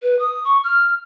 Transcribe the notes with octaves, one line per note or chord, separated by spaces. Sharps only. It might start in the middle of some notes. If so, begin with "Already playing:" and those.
B4
D#6
C#6
F6